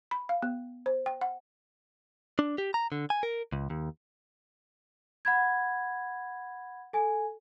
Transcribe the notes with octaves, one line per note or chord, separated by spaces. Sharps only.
B5
F5
B3
C5
G5
F#5
D4
G4
A#5
D3
G#5
A#4
C#2
D#2
F#5 B5 G#6
A4 G#5